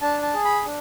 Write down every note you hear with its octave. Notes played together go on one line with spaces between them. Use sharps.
D4 A5
A5
G#4
B5
D4